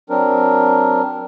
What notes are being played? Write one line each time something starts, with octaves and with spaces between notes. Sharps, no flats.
F#3 C4 D4 A#4